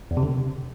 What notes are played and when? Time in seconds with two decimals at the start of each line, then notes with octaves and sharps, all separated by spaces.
0.11 E2
0.17 C3
0.23 D3
0.29 C3